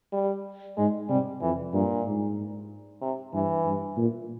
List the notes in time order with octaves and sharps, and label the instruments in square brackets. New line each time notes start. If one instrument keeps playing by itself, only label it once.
[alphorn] G3
[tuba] G#2 [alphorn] G#3
[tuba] C3 [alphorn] G3
[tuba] F2 [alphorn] E3
[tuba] G2 [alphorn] A#2
[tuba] G#2
[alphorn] C3
[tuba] G2 [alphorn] E3
[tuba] G2
A#2